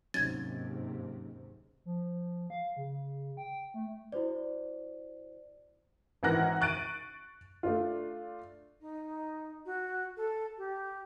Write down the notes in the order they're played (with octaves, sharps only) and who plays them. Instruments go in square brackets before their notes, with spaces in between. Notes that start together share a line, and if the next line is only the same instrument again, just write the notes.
[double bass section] D#2 G#2 C3 [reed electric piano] F#3 C#4 D#4 [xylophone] G#6 A6
[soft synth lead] F3
F5
C#3
G5
A3
[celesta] E4 F#4 C5 D5
[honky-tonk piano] G#1 E3 A#4 F#5 F#6 A#6
C#6 F#6 A6 D7 D#7
A3 D4 F4
[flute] D#4
F#4
A4
G4